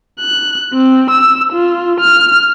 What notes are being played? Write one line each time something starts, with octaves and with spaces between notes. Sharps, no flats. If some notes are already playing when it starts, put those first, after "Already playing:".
F#6
C4
E6
F4
F6